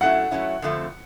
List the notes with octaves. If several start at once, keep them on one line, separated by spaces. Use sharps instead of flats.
F#3 A3 C#4 E4 F#5
F#3 A3 C#4 E4
F2 D3 F3 A3 C4